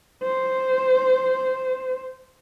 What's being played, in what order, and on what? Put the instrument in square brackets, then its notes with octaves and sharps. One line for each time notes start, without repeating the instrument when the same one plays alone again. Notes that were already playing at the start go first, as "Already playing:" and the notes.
[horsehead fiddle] C5